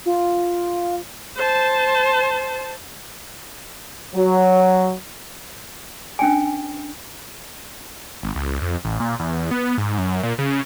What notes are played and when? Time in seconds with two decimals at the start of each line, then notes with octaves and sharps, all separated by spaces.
0.05 F4
1.36 C5 A5
4.15 F#3
6.19 C#4 D4 G5 G#5
8.23 G#1
8.35 C#2
8.62 F2
8.84 A1
9.00 A#2
9.20 E2
9.51 B3
9.78 G#2
9.98 F#2
10.23 A#2
10.39 C#3